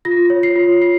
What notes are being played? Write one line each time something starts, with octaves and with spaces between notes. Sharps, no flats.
F4 A#6
C#5
C7
F4
F4 C7